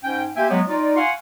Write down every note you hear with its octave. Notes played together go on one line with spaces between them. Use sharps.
G#2 C#4 G5
A#3 G4 C5 E5 G5 G#5
F#3 G#3 B3
D#4 F4 D5
F5 F#5 G#5 C6 C#6